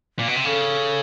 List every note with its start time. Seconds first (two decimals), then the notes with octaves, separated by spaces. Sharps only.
0.19 A#2
0.28 B2
0.36 C3
0.45 C#3 A4